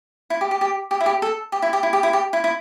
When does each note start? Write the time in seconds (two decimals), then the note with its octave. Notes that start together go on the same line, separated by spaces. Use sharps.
0.30 E4
0.41 G4
0.51 G4
0.61 G4
0.91 G4
1.01 E4
1.06 G4
1.22 A4
1.52 G4
1.62 E4
1.73 G4
1.83 E4
1.93 G4
2.03 E4
2.13 G4
2.33 E4
2.44 E4